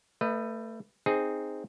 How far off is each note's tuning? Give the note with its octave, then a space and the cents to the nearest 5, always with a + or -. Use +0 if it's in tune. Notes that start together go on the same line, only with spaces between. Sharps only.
A3 +25 B4 +0 D#5 -15
C4 +0 D#4 +0 G#4 +0